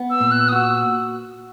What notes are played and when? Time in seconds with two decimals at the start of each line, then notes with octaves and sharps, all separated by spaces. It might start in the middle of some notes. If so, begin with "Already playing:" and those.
Already playing: B3
0.10 E6
0.20 A#2
0.31 F#6
0.48 D#6
0.52 F#4 E6